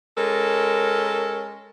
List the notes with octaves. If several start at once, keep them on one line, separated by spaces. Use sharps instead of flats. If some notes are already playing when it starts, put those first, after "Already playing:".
G#3 C#4 A4 A#4